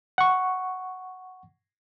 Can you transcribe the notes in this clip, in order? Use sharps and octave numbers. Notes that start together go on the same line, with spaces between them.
F#5 C#6